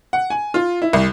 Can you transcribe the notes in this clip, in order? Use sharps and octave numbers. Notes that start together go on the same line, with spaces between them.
F#5
G#5
F4
E4
C2